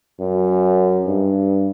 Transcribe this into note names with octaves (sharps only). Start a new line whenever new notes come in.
F#2
G2